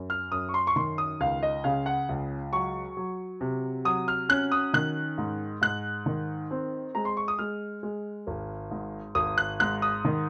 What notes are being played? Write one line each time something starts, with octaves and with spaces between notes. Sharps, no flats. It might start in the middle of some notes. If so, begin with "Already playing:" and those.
Already playing: F#2
F6
F#2 D#6
C#6
C6
C#6
D#3 C6
D#6
C#2 F5
D#5
C#3 F5
F#5
C#2
F#3 C#6
F#3
C3
F#3 D#6
F6
C#4 F#6
D#6
D#3 F#6
G#2
G#2 F#6
D#3
C4
G#3 A#5
C6
C#6
D#6
G#3 F6
G#3
G#1
G#2
G#1 D#6
F#6
G#2 F#6
D#6
D#3